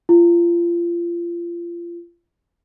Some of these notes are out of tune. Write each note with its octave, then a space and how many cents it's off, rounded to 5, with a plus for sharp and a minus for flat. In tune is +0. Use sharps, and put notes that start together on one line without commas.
F4 -30